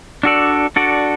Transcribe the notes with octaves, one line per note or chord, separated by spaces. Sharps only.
D4 F#4 A4 D5
D4 F#4 A4 D5